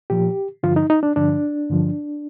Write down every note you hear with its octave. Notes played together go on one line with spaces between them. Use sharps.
A#2 F3 G4
G2 D3 F3 F4
D#4
D#4
D4
G2 D3 F3 D4
G2 D3 F3